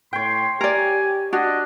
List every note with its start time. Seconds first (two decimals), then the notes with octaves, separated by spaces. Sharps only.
0.13 A2 C#5 G5 C6
0.61 G4 A#4 D5 G#5
1.33 D4 F#4 D#5